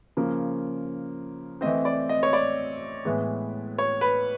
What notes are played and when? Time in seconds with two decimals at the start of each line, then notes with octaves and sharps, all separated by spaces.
0.17 C#3 F3 A#3
1.61 E3 A3 C4 D#5
1.85 D5
2.09 D#5
2.23 C#5
2.33 D5
3.05 A2 E3 G#3 B3
3.78 C#5
4.01 B4